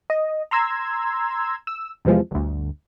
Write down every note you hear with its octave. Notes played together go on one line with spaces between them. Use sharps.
D#5
A#5 C6 E6 G#6
E6
E2 C3 E3 F3 G#3
G1 D2